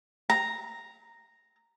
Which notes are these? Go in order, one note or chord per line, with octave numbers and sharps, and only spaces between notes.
A#5